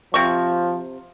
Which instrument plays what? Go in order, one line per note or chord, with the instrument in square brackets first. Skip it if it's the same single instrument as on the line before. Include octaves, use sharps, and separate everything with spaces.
[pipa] C3 C#6 [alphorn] F3